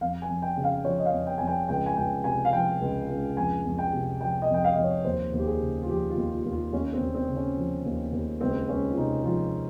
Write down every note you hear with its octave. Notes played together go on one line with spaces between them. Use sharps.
F2 F5
G#5
F2
G5
C#3
F5
F3 C#5
D#5
F5
F2
G5
F2 G#5
G5
C#2 G5
G#5
C#2 G5
C3 G#5
F5
F3 G5
C#2
C#2
F2 G#5
F2
G5
C3
F3 G5
D#5
F2
G5
F5
F2 D#5
C#5
D#2 C5
D#2
G4
G#4
C#3
F4
F3 G4
F4
D#2
F4
D#2
F4
D#2 C#4
C4
D#2
C4
C#3
C#4
F3
D#2
D#2
C#2 C4
C#2 C#4
F4
C3 D#4
F3 F4